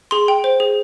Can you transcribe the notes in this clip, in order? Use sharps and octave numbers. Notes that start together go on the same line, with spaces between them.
G#4 C6
G5
C5
G#4